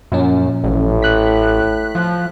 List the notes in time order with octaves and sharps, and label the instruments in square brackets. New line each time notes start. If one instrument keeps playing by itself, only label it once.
[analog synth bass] F#2 [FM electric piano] A#2 F3 C#4
[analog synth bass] A1 [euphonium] A2
[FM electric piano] F#6 B6
[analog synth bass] F3